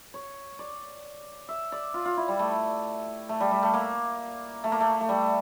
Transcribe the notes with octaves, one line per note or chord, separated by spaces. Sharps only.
C#5
D5
E5
D5
F4
F4
E4
G3
A3
A3
G3
G3
A3
A#3
A3
A#3
A3
A3
G3